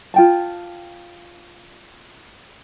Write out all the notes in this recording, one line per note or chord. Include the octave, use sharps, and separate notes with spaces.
F4 G5 A5